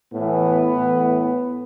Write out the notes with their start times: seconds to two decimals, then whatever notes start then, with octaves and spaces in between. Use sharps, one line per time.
0.13 A2 E3 B3
0.73 A2 E3